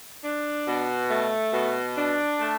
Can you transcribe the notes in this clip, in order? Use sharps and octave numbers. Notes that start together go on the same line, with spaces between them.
D4
B2
A3
B2
D4
A3